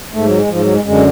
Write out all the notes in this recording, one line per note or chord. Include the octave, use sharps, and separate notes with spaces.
G#2 A3
F#3
G#3
G#2 F3
F#3
G#3
F#2 D3 G#3